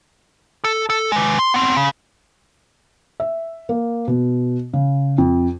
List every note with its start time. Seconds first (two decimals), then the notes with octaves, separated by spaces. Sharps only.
0.64 A4
0.90 A4
1.12 G#3 B4
1.39 C6
1.54 B3 C4
1.76 C#3
3.20 E5
3.69 A#3
4.08 B2
4.73 C#3
5.18 F2